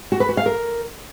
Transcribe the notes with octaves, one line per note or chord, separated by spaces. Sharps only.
F#4
B4
F#4
F5
A#4